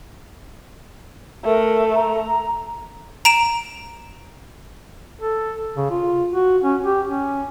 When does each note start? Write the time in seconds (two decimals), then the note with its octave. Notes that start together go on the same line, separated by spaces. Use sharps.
1.45 A3 A#4
1.95 A#5
3.25 A#5 D7 E7
5.22 A4
5.77 C#3
5.91 F4
6.30 F#4
6.64 C#4
6.85 G4
7.08 C#4